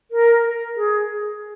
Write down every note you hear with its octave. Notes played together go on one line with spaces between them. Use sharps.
A#4
G#4